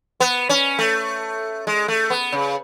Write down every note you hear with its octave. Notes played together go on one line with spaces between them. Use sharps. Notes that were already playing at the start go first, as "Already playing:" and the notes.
B3
C#4
A3
G#3
A3
B3
C#3